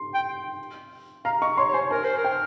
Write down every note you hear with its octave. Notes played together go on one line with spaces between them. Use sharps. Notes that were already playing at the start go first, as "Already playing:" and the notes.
Already playing: C6
G5
F5 A#5
D#5 C#6
C#5 C6
C#5
C5 G#5
A#4 G#5
C5
A#4
G5